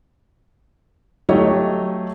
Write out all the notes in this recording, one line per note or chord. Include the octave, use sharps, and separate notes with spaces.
F#3 A3 G4 C#5 D#5